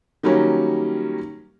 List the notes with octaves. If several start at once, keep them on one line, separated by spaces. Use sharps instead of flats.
D#3 F#3 G3 A#3 C#4